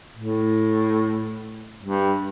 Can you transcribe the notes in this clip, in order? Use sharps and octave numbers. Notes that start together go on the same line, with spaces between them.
A2
G2